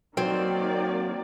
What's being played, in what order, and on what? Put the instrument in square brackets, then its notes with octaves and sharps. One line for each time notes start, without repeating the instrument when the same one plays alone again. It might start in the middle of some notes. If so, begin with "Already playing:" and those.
[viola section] D#3 A#3 D5 [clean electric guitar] F#3 [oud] C4